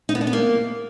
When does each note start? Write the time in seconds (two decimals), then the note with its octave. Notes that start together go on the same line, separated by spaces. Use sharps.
0.09 D#4
0.15 B3
0.21 D4
0.27 B3
0.33 A#3